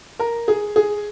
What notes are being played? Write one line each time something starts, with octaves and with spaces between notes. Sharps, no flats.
A#4
G#4
G#4